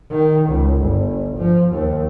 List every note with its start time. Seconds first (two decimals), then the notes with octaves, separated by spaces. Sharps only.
0.11 D#3
0.49 C#2
0.82 G1
1.38 F3
1.74 D#2